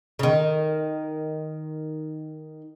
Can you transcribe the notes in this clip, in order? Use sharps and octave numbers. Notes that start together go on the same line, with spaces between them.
C#3
D#3